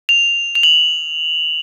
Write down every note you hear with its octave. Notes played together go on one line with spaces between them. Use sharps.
F7
F7
F#7